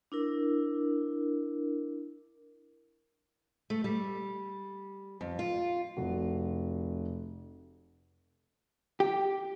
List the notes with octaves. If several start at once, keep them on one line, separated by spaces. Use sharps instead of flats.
D4 E4 A#4
A3
G3
F2
F4
F1 F#4
G4